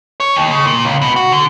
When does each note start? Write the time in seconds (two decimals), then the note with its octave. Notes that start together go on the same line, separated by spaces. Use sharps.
0.20 C#5
0.35 D#2
0.51 C#3
0.67 A#2
0.85 C#2
1.01 B2
1.16 F#4
1.32 D3